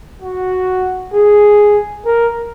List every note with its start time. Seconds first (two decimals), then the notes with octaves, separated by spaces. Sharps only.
0.22 F#4
1.14 G#4
2.06 A#4